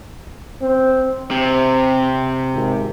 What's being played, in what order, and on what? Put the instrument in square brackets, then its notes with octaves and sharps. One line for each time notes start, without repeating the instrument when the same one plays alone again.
[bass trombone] C4
[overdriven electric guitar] C3 [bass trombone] C4
[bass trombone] G#1